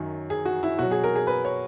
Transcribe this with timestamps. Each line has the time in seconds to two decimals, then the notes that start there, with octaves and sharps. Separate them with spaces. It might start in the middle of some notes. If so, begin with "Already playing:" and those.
Already playing: F#2 D#3 F#3
0.30 G#4
0.45 F#4
0.63 E4
0.79 B2 F#3 F#4
0.91 G#4
1.04 A#4
1.16 G#4
1.27 B4
1.45 C#5